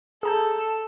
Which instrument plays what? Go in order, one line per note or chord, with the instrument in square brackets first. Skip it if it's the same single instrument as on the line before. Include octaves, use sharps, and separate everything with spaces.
[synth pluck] G#4 A#5 G6 [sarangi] A4